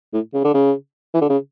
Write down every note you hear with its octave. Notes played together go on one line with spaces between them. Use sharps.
A2
C#3
D3
C#3
E3
D3
C#3